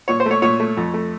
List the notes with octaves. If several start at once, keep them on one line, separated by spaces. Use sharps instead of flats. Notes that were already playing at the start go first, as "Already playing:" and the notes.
A#2 C#5
C5
A3
C#5
A#2 C#5
A3
F2
A3